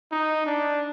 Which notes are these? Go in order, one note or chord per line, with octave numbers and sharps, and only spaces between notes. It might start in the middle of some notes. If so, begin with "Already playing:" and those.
D#4
D4